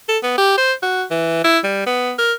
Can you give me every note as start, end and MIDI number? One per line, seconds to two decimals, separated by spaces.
0.09 0.19 69
0.23 0.36 59
0.38 0.57 67
0.57 0.73 72
0.83 1.04 66
1.11 1.41 52
1.44 1.59 64
1.64 1.86 55
1.87 2.13 59
2.18 2.33 70